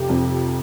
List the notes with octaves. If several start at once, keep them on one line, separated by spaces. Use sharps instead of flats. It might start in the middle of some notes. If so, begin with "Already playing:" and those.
Already playing: F1 G4
F2 C3